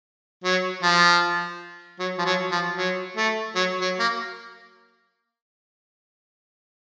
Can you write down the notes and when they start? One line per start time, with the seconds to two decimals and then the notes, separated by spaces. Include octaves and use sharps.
0.44 F#3
0.83 F3
1.99 F#3
2.18 F3
2.25 F#3
2.51 F3
2.77 F#3
3.17 A3
3.55 F#3
3.81 F#3
3.99 A#3